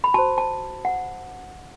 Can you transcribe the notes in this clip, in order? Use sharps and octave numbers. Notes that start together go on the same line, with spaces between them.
B5
F#4 C5 A5
A5
F#5